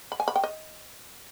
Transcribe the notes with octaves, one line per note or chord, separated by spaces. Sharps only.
B5
G#5
B5
G5
D#5